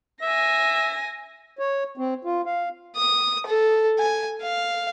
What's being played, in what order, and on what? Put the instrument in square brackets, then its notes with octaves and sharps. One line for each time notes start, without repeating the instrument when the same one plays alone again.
[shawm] E5 [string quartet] G#5 A#6
[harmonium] C#5
C4
F4
F5
[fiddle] D#6
A4
G#5
F5